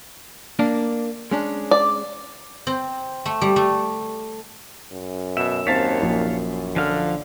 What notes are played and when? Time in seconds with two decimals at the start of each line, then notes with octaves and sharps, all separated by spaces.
0.59 A#3 D4 A#4
1.31 G#3 C#4 D4
1.71 D5
2.67 C4
3.25 A3
3.41 G3
3.56 A3
4.92 F#2
5.37 B2 E5 E7
5.67 D#2 C4 C#5 F5 A5 A6 B6
6.02 A#1
6.76 D3 F3 F5 F6